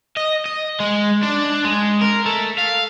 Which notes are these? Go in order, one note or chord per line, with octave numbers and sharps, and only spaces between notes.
D#5
D#5
G#3
D4
G#3
A#4
A3
F5